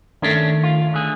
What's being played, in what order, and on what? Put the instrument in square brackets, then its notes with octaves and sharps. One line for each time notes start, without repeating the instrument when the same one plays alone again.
[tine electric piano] D#3 A3 [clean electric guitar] C#4 D4
[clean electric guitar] F4
D3 G#4